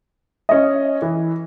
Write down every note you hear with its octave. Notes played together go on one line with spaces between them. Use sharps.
C#4 D#5
E3